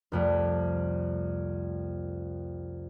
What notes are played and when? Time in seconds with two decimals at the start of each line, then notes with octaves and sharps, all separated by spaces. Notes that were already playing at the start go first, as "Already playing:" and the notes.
0.12 C2 F2 A3